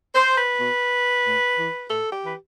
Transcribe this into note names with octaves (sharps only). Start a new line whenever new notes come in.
C5
B4
B2
A2
E3
A2 A4
G4
E3 B4